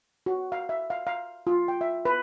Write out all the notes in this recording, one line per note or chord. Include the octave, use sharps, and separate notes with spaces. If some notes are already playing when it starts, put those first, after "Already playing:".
F#4
F5
E5
F5
F5
F4
G5
E5
B4